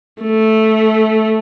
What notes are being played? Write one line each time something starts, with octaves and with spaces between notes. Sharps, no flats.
A3